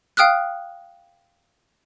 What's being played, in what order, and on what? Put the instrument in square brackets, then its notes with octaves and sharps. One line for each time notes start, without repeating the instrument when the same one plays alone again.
[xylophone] F5 G5 D#6 F6 F#6